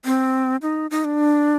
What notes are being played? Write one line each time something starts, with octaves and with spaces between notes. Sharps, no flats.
C4
D#4
D#4
D4